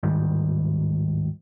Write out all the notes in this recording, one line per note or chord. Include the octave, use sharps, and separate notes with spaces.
D1 G#2 D#3 G3